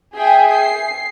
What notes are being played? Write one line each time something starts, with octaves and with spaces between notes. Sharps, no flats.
G#4 E5 G5 G#5
C7